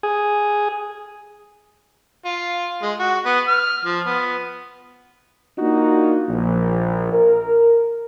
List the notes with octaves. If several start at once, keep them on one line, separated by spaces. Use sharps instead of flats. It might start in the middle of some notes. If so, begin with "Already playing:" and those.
G#4
F4
G#3
F#4
B3
F6
F3
B3
A#3 D4 D#4 F4 F#4
A#1
A#4